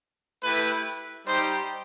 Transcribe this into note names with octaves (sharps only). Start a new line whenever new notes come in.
A3 E4 G4 B4
G3 D#4 G4 C5